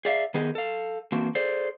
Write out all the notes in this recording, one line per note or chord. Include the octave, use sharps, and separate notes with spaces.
G#4 D5 E5 F5
D#3 B3 G4 G#4 D#5
A4 F5
E3 A#3 C4 D4 F#4
G#4 A4 C5 D5